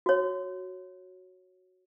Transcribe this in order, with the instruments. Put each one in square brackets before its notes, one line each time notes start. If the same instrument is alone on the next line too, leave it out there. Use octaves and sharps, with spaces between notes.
[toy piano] F#4 C#5